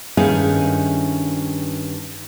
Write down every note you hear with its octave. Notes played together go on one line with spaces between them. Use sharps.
G2 D#3 C#4 E4 G#4 F5